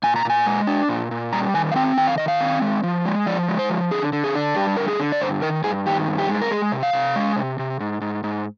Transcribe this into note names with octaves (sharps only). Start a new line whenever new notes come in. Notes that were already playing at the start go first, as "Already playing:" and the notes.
A#2 G#5
A#5
A#2 G#5
G#3
D4
A#2
A#2
G3 A#5
D#3 G#5
F5
C4 G5
D#3 G5
F5
D#3 D#5
F5
C4
G#3
F3
G#3
F3 D5
G#3
C5
F3
D3 G#4
D3
G#4
D4
G3 G4
D3 A#4
G#4
D3
D5
G2 C5
D#3 A#4
G2 G#4
D#3 G4
G2
G4
G#3
A#4
G#3 G#4
C3
F5
C3
G#3
C3
C3
G#2
G#2
G#2